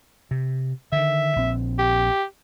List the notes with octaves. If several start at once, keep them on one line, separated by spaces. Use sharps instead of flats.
C3
D3 D#3 E5
A#1 C4
G4